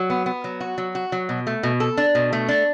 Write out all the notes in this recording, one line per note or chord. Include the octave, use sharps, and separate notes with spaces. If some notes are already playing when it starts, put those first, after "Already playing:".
Already playing: F#3
B3
B3
F#3
F#4
F#3
F#4
F#3
B2
A3
B2
A4
D4
B2
A3
D4